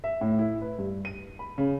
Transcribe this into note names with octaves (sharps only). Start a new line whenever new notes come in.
E5
A2
E4
B4
G2
D#7
B5
C#3